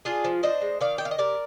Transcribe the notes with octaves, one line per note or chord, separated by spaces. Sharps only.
D4 F4 G#4
F3
D4 C5 D#5
G#3
D#3 D5 F5
D#3 G5
F5
D#5
C3 A#4 D5